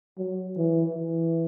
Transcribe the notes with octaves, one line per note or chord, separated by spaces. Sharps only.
F#3
E3
E3